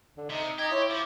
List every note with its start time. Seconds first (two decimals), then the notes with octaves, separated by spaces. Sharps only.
0.17 D3
0.30 C3 D#4
0.58 D#4 G4 D#5 G#6
0.71 E4 C#5 C6 C#6
0.90 F3 D6